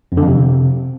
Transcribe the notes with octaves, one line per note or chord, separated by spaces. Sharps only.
F2
D3
F2
C3